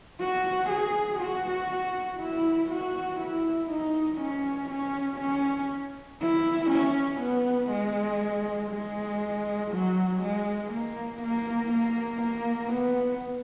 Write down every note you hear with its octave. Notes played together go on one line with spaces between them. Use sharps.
F#4
G#4
F#4
E4
F#4
E4
D#4
C#4
C#4
C#4
E4
C#4
B3
G#3
G#3
F#3
G#3
A#3
A#3
A#3
A#3
B3